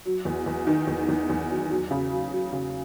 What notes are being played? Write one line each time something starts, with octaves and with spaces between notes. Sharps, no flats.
F#3
E2
E2
D#3
E2
E2
E2
F#3
F#3
C#3
F#3
F#3
C#3